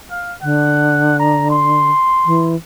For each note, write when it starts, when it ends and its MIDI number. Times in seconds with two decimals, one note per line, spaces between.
0.11 0.35 77
0.42 1.90 50
0.42 1.17 78
1.20 1.47 82
1.50 2.51 84
2.26 2.56 52